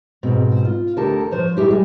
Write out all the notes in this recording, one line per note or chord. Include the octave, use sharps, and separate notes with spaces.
G#2 B2 C4
F4
D2 D3 G4 A4 A#4 A5
F3 C5 C#5
E4 G4 G#4 E5
G3 G#3